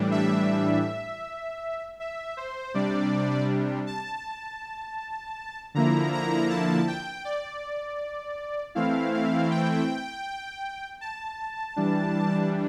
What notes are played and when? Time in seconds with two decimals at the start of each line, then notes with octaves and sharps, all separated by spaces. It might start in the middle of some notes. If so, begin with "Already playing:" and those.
Already playing: A2 E3 G3 D4
0.12 E5
2.00 E5
2.37 C5
2.74 C3 G3 D4 D5
3.87 A5
5.74 D3 F3 A#3 E4 A#5
6.13 A#5
6.50 A5
6.88 G5
7.25 D5
8.75 E3 A3 C4 E4 F5
9.13 F5
9.51 G5
11.01 A5
11.76 E3 G3 D4